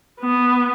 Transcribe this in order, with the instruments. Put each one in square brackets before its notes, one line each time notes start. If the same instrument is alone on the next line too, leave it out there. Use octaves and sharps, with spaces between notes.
[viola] B3